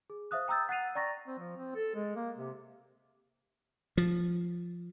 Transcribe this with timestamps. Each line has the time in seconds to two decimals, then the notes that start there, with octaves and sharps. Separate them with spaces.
0.10 G#4
0.31 C5 E5 F5 D#6 F#6
0.48 G5 A#5 D#6 E6 G6 A6
0.69 F#5 F#6 A6 C7 D#7 F7
0.95 D5 G5 A#5 C#6 A6 A#6
1.27 C4
1.39 F3
1.57 C4
1.75 A4
1.95 G#3
2.16 A#3
2.37 C3
3.97 F3